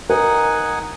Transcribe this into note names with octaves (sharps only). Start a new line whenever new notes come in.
D#4 A#4 F#5 G#5